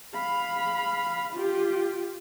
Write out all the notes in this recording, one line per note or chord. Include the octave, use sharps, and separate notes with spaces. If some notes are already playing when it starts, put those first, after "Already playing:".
F5 B5
F4 G4